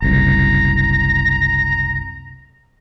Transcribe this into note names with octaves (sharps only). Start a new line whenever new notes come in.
F#1 C2 A#5